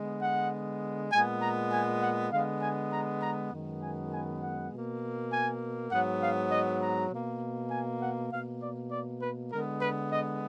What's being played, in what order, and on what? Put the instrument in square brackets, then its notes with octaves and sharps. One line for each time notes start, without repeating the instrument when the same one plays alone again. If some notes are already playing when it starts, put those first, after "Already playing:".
Already playing: [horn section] D3 G#3 B3
F#5
A#2 G#3 B3 G#5
A#5
G#5
F#5
D3 G#3 B3 F5
G#5
A#5
A#5
F#2 D#3 G#3 B3
G#5
G#5
F#5
B2 A#3
G#5
G#2 F#3 B3 F#5
F5
D#5
A#5
B2 A#3
G#5
F#5
B2 A#3 F5
D5
D5
B4
D3 G#3 B3 A#4
B4
D#5